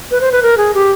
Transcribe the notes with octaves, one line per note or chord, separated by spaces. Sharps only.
B4
C5
B4
A#4
G#4
G4